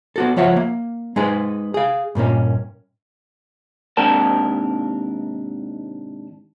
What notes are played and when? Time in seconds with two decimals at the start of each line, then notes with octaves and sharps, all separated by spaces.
0.16 B3 F#4 A4
0.36 C#2 F3 C#5 E5 F#5
0.56 A#3
1.16 G#3 D#4 G#4 B4
1.74 G#4 F5
2.15 G2 A#2 A#3 C#4
3.97 D#2 G#2 C3 D4 A#4 A5